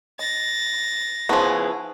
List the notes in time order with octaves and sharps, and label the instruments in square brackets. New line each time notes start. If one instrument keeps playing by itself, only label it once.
[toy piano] D#5 [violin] A6 A#6
[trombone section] C#3 E4 G#4 [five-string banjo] F3 B3 [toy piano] D#4 A5 C#6